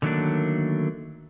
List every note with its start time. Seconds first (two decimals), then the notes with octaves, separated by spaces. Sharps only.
0.02 D3 D#3 F#3 A3 A#3 D4